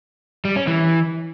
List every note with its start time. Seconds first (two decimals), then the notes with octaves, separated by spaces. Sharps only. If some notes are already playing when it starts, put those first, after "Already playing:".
0.45 G3
0.56 C#4
0.67 E3